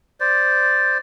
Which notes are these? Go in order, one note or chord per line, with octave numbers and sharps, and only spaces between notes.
C5 D5